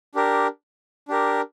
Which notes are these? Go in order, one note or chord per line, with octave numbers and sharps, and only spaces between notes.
D4 G4 A#4
D4 G4 A#4